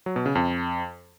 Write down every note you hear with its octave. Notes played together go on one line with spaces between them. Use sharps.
F#3
B2
C#3
F2